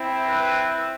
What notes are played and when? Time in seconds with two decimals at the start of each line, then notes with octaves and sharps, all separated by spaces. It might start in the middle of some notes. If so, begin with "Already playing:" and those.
Already playing: C4 E4
0.28 B4